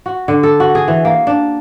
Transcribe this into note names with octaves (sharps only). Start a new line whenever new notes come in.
F#4
D3
A4
F#4
G#4
E3
A#3
D4